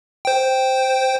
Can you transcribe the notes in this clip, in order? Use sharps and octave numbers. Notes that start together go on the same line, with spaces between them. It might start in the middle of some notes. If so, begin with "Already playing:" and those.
C5 G5